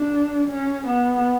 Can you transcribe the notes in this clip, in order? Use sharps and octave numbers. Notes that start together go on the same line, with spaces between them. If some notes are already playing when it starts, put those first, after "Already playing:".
Already playing: D4
C#4
B3